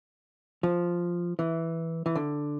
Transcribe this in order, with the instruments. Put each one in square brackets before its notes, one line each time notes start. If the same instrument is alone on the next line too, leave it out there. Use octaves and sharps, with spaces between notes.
[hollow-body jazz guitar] F3
E3
E3
D3